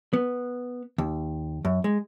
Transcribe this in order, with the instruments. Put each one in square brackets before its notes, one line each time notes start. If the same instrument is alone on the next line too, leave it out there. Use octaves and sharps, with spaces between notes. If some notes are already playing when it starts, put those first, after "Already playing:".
[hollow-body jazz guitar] B3
D#2
F#2
G#3